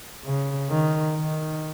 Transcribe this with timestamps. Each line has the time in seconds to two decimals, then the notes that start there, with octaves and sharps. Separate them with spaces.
0.24 C#3
0.70 D#3
1.16 D#3